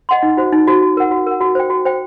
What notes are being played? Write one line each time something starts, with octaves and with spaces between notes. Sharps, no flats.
D#5 F#5 C6
D#4
F#4 C5
D#4
F#4 C5
F#4
A#4 F#5
F#4
A#4 F#5
F#4
C5 G5
F#4
C5 G5